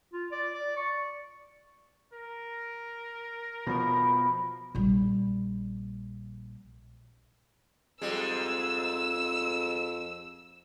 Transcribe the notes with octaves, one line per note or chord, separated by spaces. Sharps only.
F4
D5
D5
C#6
A#4
B2 F3 B5
A#1 G3
F2 G#2 G3 G#3 E6